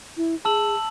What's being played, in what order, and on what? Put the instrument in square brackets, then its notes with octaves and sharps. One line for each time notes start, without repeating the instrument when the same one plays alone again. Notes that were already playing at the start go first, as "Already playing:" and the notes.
[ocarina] E4
[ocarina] G#4 [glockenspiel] A5 E6 F#7